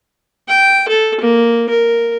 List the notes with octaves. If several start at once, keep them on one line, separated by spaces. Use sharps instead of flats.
G5
A4
A#3
A#4